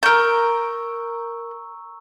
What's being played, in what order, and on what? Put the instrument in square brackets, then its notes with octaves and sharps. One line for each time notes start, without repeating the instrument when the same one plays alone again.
[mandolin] A#4 G6 [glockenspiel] A#5 C#6 E6